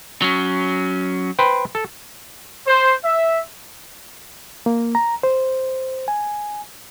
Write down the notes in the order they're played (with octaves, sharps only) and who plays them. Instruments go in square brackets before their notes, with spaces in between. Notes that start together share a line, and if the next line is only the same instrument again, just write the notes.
[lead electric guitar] F#3 C#4
[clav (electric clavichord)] B4 C5 G5
A4
[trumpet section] C5
E5
[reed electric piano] A#3
A#5
C5
G#5